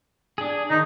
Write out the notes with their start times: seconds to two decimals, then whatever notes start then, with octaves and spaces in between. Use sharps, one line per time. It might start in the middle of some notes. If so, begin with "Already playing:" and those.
0.38 D4 G#4
0.70 D#3 D#4